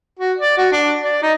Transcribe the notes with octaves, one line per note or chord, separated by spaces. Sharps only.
F#4
D5
F#4
D4
D5
D#4